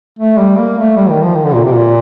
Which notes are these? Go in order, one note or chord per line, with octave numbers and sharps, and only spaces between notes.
A3
G3
A#3
A3
G3
D#3
F3
D#3
D3
A#2
C3
A#2